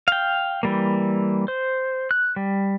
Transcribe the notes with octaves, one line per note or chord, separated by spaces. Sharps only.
F5 G5
E3 G3 A#3
C5
F#6
G3